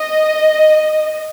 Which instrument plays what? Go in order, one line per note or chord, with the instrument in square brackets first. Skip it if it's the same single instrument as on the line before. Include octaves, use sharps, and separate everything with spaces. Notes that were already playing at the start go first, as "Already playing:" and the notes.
Already playing: [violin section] D#5